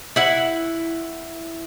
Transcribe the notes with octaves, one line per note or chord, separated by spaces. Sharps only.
E4 F#5